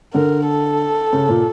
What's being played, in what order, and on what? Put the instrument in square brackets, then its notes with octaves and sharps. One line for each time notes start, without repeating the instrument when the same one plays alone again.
[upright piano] D3 [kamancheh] A#4
[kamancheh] A4
[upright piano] C#3
A#2